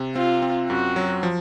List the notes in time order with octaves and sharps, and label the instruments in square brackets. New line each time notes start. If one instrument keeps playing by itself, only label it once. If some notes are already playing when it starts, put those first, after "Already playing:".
Already playing: [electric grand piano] C3
[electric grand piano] C4 [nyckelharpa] F4
[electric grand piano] C4
[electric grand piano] F#2 [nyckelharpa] F#4
[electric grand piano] F#3
F3